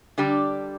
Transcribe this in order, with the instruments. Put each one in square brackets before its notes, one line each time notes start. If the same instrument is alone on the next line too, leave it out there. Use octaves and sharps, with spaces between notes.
[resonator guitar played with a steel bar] D3 G3 D4 G4 D5